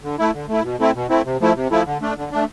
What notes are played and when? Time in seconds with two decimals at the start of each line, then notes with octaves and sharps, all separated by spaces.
0.04 D3
0.19 A3 E4
0.34 D3
0.49 A3 E4
0.64 B2
0.79 A3 C4 E4
0.95 B2
1.09 A3 C4 E4
1.25 C3
1.40 F3 A3 E4
1.56 C3
1.71 F3 A3 E4
1.86 D3
2.01 A3 D4
2.17 D3
2.32 A3 D4